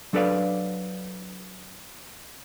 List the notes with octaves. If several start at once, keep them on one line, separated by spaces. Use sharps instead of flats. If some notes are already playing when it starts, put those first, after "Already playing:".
F#3 D4 A4 B4 D5 F5